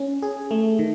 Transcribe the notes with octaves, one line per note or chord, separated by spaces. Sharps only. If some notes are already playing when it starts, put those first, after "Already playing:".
Already playing: C#4
G#4
A3
D#3